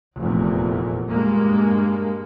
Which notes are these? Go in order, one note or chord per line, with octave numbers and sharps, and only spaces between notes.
F1 E2 A#2
G2 G#3 A#3